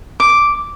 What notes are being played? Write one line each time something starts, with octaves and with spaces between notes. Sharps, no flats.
D6